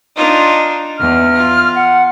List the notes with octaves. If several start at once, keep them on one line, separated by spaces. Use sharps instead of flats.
D4 D#4 F4
E2 F6
F4
F#5